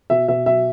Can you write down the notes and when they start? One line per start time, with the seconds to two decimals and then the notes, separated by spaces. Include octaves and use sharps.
0.10 B2 E5
0.28 B2 E5
0.46 F#3 E5